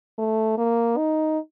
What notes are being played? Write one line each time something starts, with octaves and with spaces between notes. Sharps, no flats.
A3
A#3
D#4